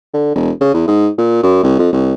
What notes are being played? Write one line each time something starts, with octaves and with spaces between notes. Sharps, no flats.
D3
E1
C#3
E2
G#2
A#2
F#2
C2
F2
C2